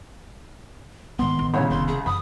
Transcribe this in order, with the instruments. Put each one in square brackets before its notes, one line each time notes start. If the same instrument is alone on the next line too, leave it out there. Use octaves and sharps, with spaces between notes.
[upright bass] G#2 G#3 [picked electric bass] D#3 B3 [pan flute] C6
[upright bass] A1
[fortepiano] C2 C#3 [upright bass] A#2 [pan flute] C#5
[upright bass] F1 [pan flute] C6
[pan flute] G#4
[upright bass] F#2 E3 [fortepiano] B5 [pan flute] D#6